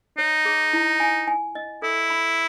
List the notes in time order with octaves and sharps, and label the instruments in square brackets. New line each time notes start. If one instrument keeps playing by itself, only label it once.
[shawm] D#4 [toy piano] C#5
[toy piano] G#4
E4
G#5
G#5
D#5
[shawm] E4 [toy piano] A4
[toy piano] B5